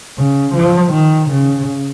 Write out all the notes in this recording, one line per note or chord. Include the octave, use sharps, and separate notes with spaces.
C#3
F3
D#3
C#3